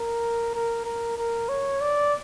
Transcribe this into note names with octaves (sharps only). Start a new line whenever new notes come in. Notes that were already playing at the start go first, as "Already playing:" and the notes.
Already playing: A#4
A#4
A#4
A#4
C#5
D5